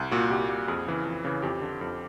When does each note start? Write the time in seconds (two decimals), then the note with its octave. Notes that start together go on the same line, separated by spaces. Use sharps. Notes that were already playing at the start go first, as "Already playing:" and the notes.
Already playing: C2
0.11 A#2 F#4
0.30 C2 G4
0.49 A#2
0.68 F2 G#4
0.87 C#3 E3
1.05 F2
1.25 C#3 E3
1.42 F2 G4
1.61 D3
1.81 F2